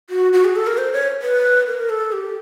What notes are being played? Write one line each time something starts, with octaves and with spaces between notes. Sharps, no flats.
F#4
F#4
G#4
A4
A#4
C5
C#5
B4
A#4
A4
G4